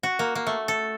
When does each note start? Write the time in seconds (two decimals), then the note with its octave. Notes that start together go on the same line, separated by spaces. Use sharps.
0.03 F#4
0.19 A#3
0.35 A#3
0.47 A3
0.68 A4